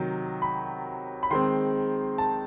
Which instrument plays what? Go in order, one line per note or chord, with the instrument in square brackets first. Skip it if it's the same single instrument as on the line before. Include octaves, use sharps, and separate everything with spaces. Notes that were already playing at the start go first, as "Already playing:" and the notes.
Already playing: [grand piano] C3 D#3 F#3
B5
B5
D#3 G#3 C4 C6
A5